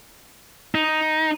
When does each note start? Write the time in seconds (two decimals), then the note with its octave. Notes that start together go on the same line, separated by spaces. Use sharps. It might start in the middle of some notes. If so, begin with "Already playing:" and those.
0.75 D#4